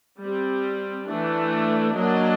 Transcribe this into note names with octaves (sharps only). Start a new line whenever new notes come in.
G3 C4
E3 A3 D4
F#3 A#3 D4 D#5